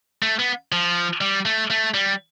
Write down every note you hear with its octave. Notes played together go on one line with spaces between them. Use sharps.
A3
B3
F3
G3
A3
A3
G3